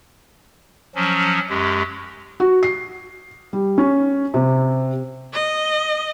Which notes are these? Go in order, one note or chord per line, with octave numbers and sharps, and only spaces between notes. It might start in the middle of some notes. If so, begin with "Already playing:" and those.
F3 F#3 C#4
F#2 G#3 G4
F#4
C7
G3
C#4
C3
D#5